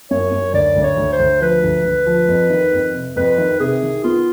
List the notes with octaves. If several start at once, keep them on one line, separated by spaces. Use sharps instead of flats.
F#2 C#5
F#2
D2 D5
D2
C#5
D2
C5
D2
F3 B4
D2
D2
F3
F2
D#3
F2
C3
F2 B4
D#3
C3 G#4
D#3
B3 F4